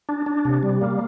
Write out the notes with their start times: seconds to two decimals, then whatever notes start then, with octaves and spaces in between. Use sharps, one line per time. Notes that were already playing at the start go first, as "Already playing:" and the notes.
0.09 D4
0.26 D4
0.45 C3
0.63 G3
0.81 A#3